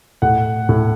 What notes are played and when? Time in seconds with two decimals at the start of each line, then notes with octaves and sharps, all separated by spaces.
0.22 A2 F#5
0.69 A2